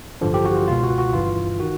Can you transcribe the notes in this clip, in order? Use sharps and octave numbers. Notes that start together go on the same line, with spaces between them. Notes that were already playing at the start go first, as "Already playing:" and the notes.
A1 G2 D3 F3
G4
F#4
F4
C#2 B2 F4
F#4
F#4
G1 G2 E3 F4
D#3 F#4